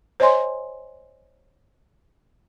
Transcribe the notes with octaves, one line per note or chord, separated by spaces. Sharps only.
C5 C#5 D#5 G#5 C6